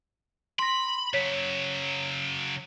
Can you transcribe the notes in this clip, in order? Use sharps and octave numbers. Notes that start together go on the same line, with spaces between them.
B5 C6 A#6
C#3 F#3 C#5 B6